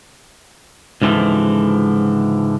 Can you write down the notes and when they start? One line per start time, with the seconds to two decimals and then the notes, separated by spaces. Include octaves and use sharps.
1.02 C#2 G#2 D3 E3 F3